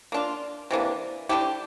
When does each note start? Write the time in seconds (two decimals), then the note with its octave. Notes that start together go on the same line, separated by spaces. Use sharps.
0.12 A#3 D4 F4
0.71 C3 E3 A#3 D4
1.29 D3 A3 E4 G4